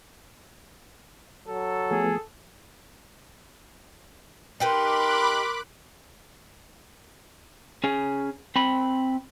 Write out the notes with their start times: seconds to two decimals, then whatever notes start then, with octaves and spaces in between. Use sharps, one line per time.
1.48 F#3 A4
1.91 F3 A3 B3 G#4
4.60 D#4 G4 A#4 B4 B5 C6 D6 F#6
7.84 C#4 G#4
8.56 C4 B5